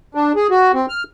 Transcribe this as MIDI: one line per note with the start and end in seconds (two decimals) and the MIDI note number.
0.15 0.33 62
0.36 0.47 68
0.50 0.72 66
0.74 0.86 60
0.89 1.03 89